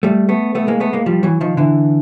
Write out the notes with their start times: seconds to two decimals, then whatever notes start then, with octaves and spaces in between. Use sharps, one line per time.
0.03 G3 A3
0.29 A3 B3
0.55 A3 B3
0.68 G#3 A#3
0.80 A3 B3
0.93 G#3 A#3
1.06 F3 G3
1.23 E3 F#3
1.41 D#3 F3
1.57 D3 E3